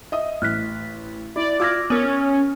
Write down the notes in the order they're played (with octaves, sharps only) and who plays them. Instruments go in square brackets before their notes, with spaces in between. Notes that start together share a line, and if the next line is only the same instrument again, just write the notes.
[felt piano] D#5 E5 D#6
[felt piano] A1 [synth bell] F6 F#6 B6
[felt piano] E4 [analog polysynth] D5
[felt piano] F4 E6 F6 [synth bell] D6 G#6 A#6
[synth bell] B3 A#4 [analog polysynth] C#4 [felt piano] D#6